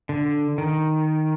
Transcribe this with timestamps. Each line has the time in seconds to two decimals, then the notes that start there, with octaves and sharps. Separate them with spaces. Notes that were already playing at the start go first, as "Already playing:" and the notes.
0.09 D3
0.58 D#3